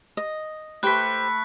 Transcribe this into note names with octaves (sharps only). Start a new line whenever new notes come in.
D#5
A3 G4 B4 C5 G5 B5 F#6 B6